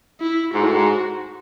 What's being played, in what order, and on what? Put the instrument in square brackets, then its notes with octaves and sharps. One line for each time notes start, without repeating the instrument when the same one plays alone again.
[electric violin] E4
[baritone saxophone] G#2 [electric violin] F#4
[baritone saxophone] A2
G#2